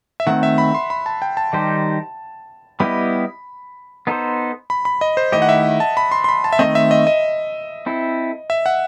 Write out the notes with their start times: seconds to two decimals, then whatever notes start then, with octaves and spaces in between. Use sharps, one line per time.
0.20 E5
0.27 D#3 A3 C4 F#5
0.43 E5
0.58 B5
0.75 C6
0.90 B5
1.06 A5
1.22 G5
1.37 A5
1.53 D#3 G3 D#4 G4 C5
2.80 G3 B3 E4 G4 D#5 B5
4.07 B3 D#4 A4 C5
4.70 B5
4.85 B5
5.01 D#5
5.17 C5
5.32 D#3 A3 E4 G4 D#5
5.42 F#5
5.49 E5
5.80 A5
5.97 B5
6.12 C6
6.24 C6
6.29 B5
6.44 A5
6.53 E5
6.59 D#3 A3 C4 D#5
6.75 E5
6.91 D#5
7.07 D#5
7.86 C4 E4 A4
8.50 E5
8.66 F#5